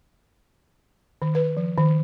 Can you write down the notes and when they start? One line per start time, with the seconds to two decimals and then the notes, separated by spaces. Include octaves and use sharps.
1.22 D#3
1.35 B4
1.57 F3
1.78 D#3